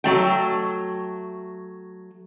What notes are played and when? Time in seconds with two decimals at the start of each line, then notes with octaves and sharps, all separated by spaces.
0.04 F#3 A3 G5